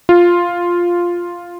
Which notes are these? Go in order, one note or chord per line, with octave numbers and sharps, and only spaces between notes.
F4